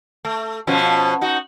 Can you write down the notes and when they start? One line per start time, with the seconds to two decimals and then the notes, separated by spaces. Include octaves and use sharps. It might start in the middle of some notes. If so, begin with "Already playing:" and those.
0.25 A3
0.67 B2 F3 C#4
1.21 D#4 F#4